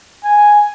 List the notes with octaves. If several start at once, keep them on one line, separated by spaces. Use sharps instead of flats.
G#5